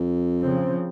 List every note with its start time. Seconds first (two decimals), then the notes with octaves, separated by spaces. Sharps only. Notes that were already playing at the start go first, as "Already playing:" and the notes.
Already playing: F2
0.43 C#3 F3 C4